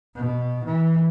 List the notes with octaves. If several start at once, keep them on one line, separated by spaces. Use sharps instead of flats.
B2
E3